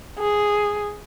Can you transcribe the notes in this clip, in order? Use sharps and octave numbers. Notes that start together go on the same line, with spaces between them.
G#4